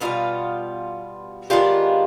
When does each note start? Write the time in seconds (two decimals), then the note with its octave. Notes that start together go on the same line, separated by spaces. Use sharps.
0.01 B2 G3 B3 D#4 F4
1.50 D#3 G#3 B3 D4 F4 G4